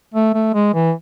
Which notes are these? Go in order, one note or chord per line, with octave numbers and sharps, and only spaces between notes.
A3
A3
G#3
E3